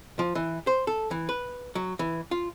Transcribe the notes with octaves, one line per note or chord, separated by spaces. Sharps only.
F3
E3
C5
A4
E3
B4
F#3
E3
F4